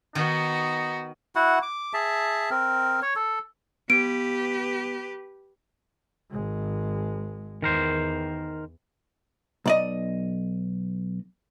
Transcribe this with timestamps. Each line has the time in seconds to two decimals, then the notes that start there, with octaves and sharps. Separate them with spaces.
0.15 D#3 B3 D#4 F#4
1.36 E4 F#4 F#5
1.62 D6
1.93 G#4 E5 A5
2.50 C4 A#4
3.02 C#5
3.16 A4
3.90 B3 G4 B4 D7
6.31 G#1 G#3
7.62 E2 D#3 A#4 C5
9.66 B1 D5 D#5